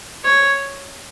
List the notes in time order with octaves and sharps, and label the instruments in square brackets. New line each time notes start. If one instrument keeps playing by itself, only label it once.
[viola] C#5